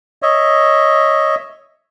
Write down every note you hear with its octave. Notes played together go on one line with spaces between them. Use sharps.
C#5 D#5 E5